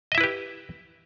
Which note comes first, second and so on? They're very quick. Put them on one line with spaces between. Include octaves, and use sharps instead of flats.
D#5 E5 E4 B4 G4